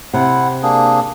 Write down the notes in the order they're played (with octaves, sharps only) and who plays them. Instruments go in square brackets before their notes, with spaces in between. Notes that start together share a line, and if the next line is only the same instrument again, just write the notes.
[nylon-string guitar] C3 [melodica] E4 F#5
[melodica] A#3 D4 G#4